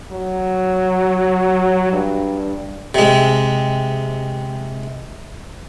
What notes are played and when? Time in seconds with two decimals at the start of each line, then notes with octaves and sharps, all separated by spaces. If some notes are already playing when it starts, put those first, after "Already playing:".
0.12 F#3
1.92 G2
2.95 C3 G#3